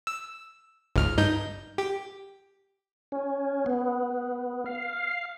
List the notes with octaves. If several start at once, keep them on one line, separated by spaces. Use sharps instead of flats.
E6
G#1 C#2 F6
G2 D#4 G6
G4
C#4
B3
F5